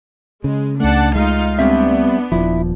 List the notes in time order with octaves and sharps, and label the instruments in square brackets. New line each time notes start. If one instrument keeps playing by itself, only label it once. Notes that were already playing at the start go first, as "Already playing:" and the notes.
[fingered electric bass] C#3 [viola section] G#3
[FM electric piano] C#2 A3 [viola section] D4 F#5 A5
[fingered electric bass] G#3 [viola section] D#4 F4 F5
[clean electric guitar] G3 C4 E5 [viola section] B3 D4
[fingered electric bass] D#1 F3 [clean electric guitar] E4